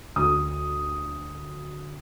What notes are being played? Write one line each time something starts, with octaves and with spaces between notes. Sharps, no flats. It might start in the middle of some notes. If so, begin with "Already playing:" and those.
D2 D#6